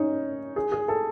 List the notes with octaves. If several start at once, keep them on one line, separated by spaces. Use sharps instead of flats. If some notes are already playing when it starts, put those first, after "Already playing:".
Already playing: C#4 D#4
G#4
G#4
A4